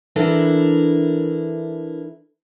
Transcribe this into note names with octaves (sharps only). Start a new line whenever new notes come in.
E3 D4 E4 A4 A#4